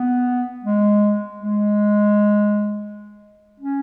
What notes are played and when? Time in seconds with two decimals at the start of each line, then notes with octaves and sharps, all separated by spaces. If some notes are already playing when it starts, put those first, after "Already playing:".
Already playing: B3
0.64 G#3
1.38 G#3
3.60 C#4